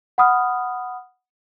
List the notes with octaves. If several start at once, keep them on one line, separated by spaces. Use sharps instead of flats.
F#5 B5 D#6 F6